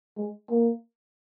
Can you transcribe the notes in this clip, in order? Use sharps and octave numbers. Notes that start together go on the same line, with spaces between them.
G#3
A#3